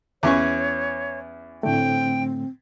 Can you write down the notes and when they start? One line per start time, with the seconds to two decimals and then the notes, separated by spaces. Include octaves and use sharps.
0.23 E2 C#4 C#5 C#6
1.63 A2 D3 A3 C4 G5